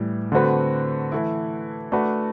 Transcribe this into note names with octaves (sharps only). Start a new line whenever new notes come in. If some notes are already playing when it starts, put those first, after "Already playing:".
Already playing: A2 E3 G3
D3 A3 C4 F#4 B4
E3 A3 E4
A3 D4 F#4 B4